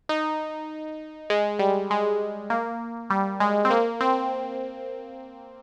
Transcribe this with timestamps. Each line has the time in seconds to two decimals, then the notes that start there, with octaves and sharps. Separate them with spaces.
0.09 D#4
1.30 G#3
1.59 G3
1.90 G#3
2.50 A#3
3.10 G3
3.40 G#3
3.65 C4
3.70 A#3
4.01 C4